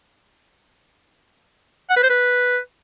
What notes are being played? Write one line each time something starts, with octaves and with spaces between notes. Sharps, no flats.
F#5
B4
C5
B4